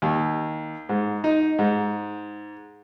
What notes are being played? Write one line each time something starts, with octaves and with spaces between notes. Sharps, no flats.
D#2
G#2
D#4
G#2